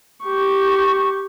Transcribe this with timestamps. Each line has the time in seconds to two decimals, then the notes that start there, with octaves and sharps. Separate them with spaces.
0.24 G4 C#6